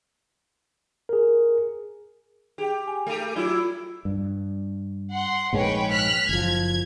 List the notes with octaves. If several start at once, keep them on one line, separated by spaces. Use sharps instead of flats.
G#4 A#4
G4 G#4 G5
G#5
A3 G4
F#3 E4 F4
G2
F#5 C6
A#1 G#2 G#3 B4 C#5 G5
F6 F#6 B6
F#1 F3 G#6